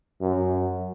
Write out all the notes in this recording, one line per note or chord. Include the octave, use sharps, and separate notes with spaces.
F#2